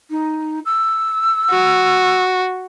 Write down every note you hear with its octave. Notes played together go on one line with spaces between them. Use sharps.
D#4
E6
F#4